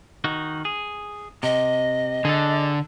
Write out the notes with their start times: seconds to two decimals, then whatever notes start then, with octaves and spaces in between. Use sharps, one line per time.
0.24 D#3 D#4 F#4
0.65 G#4
1.43 C3 D#5
2.25 D3 G#4 A4